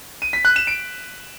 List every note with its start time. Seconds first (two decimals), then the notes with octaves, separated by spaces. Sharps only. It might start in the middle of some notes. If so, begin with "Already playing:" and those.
0.22 D#7
0.33 B6
0.45 F#6
0.56 E7
0.67 D7